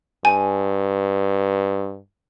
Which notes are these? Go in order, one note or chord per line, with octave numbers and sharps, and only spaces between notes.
G2 G#5